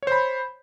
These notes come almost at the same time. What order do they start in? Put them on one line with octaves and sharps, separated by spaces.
C#5 C5 B5